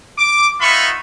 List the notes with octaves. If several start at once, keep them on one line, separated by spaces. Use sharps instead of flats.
D6
B3 D#4 F4 E5 B5 C#6